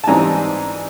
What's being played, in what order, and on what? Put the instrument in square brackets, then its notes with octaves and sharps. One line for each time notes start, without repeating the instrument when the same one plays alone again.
[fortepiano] A5
G#2 E3 G3 C4 G#5 A#5